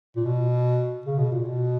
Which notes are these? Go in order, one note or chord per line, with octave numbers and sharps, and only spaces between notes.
A#2
B2
C#3
B2
A#2
B2